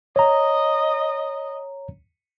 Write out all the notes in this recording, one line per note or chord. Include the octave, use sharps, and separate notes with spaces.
C#5 D#5 A#5